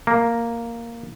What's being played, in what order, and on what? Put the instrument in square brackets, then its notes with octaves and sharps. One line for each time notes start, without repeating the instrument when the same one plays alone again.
[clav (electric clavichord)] A#3